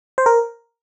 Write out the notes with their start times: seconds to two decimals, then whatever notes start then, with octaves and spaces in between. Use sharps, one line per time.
0.18 C5
0.26 A#4